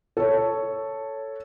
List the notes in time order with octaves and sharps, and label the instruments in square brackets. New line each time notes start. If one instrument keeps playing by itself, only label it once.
[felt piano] A4 C#5